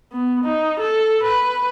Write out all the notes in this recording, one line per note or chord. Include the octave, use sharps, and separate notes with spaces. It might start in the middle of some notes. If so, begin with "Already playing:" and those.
B3
D#4
A4
B4